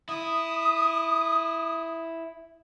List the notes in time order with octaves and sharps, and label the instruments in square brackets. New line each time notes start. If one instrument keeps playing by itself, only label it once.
[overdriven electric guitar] E4 [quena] D#6